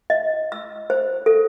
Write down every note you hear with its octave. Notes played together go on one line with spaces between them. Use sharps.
D#5
E6
C5
A4